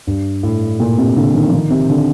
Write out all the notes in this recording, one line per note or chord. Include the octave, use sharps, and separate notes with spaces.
G2
A2
A#2
C3
D3
D#3
F3
D#3
C3
D3